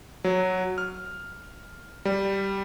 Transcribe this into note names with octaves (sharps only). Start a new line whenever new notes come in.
F#3
F6
G3